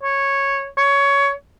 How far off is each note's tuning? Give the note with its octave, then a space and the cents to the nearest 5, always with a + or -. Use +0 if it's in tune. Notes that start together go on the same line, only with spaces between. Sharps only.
C#5 -5
C#5 +15